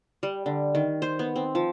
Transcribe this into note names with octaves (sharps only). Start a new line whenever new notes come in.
G3
D3
D#3
C5
B3
C4
F3